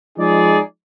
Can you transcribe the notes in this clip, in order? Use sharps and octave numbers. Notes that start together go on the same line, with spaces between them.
F3 G#3 D#4 G#4 D5